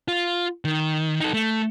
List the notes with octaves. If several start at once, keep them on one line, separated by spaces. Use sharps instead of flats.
F4
D#3
D#4 A4
A3